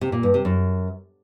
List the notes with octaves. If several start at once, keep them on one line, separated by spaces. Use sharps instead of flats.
C3
A#2
G2
C3
F#2